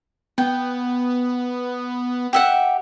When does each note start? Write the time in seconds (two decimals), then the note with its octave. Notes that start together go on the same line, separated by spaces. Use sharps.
0.38 B3 G5
2.33 G4 E5 F#5